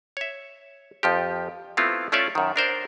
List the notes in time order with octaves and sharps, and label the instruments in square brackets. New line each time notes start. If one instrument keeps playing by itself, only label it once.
[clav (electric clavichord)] C#5 E5
F2 F3 G4
A3 B3 C4 E4 F4
A3 C#4 F4 C#5 D5 E5
F#2 D#3
D4 A#4 C5 D5